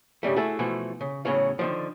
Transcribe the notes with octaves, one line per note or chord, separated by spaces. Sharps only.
G2 C#3 G3 A3
A3 E4 F#4 G#4 A4
B2 E3 F3 A3 F#4
C#3
E2 A2 C#3 F#3 C#5 F5
D3 D#3 F3